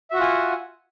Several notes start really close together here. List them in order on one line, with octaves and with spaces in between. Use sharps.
E5 F#4 F#5 F4 G#5